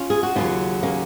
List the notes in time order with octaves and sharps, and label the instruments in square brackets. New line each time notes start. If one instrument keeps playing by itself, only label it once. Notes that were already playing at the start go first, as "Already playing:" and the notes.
Already playing: [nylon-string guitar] C#4 F4
G#4
F#4
D#2 C#3 F#3 C#4 F4
A#3 C#4